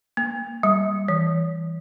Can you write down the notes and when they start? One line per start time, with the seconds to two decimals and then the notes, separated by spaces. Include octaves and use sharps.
0.17 A#3
0.63 G3
1.08 E3